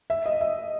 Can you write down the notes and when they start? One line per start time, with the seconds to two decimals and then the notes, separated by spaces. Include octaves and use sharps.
0.10 E5
0.26 D#5
0.41 E5